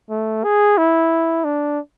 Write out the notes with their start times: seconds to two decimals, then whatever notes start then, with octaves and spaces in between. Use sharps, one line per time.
0.10 A3
0.44 G#4
0.77 E4
1.44 D4